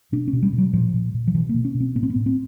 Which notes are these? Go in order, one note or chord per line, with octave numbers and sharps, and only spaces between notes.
B2 D4
C#4
B2
G3
B2
F#3
A#2 F3
A#2
A#2
F3
B2 E3
A#3
B2
C#4
B2
C4
A2 B3
C4
B3
A2
C4